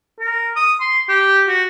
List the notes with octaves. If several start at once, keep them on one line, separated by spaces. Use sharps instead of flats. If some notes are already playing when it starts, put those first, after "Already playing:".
A#4
D#6
C6
G4
F#4